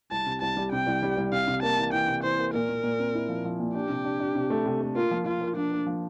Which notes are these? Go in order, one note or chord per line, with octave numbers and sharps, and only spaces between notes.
C2 A5
C3
C2 A5
G3
C3 G5
C2
G3
C2
C3 F5
C3
A#3 A5
E3
E3 G5
C3
E3 C5
A#3
A#2 A#4
A#2
A#2
C4
E4
F3
F3
A#2
D4 G4
C3
D4
D4
C3
A3
C3
A3
A#3 F4
F3
F3 F4
A#3
F3 D4
A#3
F3